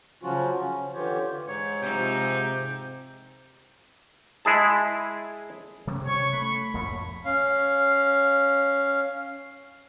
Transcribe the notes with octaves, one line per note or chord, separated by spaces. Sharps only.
C#3 F3 F#3 C#4 F4 F#4
C#4
D3 E3 F4 G4 C#5
G#2 C#5
C3 F3 D#4 G4 E6
G#3 E4 G#4 A5
C3 G3 C#4
C#5 C#6
A3 B5
F2 A2 F3
C#4 F5